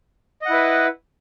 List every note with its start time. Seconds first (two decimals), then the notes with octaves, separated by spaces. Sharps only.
0.42 D#5
0.46 F#5
0.50 E4
0.54 B4